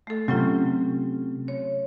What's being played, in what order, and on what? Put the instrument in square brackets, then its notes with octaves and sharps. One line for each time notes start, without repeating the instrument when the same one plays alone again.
[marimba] A3 A4
[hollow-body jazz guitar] C3 [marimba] F#3 C#4 F4
[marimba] C#5